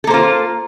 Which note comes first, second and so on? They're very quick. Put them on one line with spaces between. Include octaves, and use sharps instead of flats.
A4 A#3 C5 F4